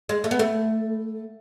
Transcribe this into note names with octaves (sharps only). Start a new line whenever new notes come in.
G#3
A3
B3
A3